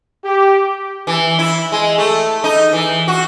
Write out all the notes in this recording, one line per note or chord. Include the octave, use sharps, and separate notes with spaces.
G4
E3
E4
G#3
A3
D#4
E3
F#4